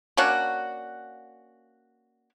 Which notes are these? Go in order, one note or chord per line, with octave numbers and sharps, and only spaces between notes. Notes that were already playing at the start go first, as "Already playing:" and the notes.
A#3 C#4 D4 F#4